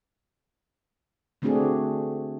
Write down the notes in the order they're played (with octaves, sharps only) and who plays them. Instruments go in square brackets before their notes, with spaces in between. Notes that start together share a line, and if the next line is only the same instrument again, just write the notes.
[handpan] D3 A3 C4 D4 F#4 G#4